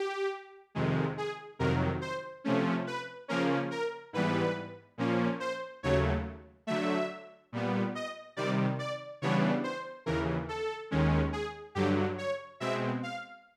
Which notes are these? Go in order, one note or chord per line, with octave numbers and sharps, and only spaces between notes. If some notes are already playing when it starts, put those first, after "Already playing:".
Already playing: G4
F2 C3 D#3 G#3
G#4
F2 C3 D#3 F#3 A#4
C5
C3 F3 A3 C#4
B4
C#3 F3 A#3 C#4 A#4
A#4
G#2 E3 G3 B3 B4
A#2 F3 A#3 C#4
C5
D#2 C#3 F#3 A3 C#5
D3 F#3 A3 E5
A#2 G3 B3
D#5
C3 D#3 G3 D5
D5
C#3 E3 G3 B3 D4 C#5
C5
D#2 C#3 E3 A#4
A4
D#2 D#3 G#3 C#4
G#4
G2 D3 F#3 G4
C#5
B2 G#3 C4 E5
F5